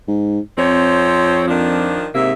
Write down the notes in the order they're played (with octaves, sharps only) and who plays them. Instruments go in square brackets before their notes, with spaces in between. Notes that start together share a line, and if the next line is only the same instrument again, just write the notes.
[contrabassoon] G#2
[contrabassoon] F2 [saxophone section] F3 C4 C#5
[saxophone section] D#3 F3 D4
[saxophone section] G#2 A#3 E5 [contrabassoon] C3